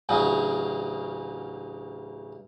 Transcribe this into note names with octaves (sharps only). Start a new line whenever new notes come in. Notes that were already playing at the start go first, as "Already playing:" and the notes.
A1 D2 C#3 F#3